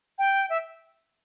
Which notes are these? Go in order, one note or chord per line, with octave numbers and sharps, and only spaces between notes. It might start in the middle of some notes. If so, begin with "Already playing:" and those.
G5
E5